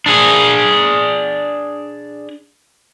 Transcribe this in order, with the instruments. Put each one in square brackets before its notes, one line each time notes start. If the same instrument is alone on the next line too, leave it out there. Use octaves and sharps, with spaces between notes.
[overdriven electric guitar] D4 G#4